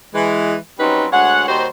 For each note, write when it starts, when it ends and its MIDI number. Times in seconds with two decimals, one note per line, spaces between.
0.15 0.56 52
0.15 0.56 56
0.79 1.07 54
0.79 1.07 55
0.79 1.07 60
0.79 1.07 61
0.79 1.07 63
0.79 1.07 71
1.12 1.45 38
1.12 1.45 56
1.12 1.45 73
1.12 1.45 78
1.48 1.66 39
1.48 1.66 55
1.48 1.66 63
1.48 1.66 66
1.48 1.66 72